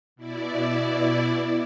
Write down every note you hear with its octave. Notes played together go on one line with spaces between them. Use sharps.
B2 E4 D5